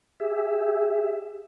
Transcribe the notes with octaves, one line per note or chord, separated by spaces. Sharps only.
G4 G#4 E5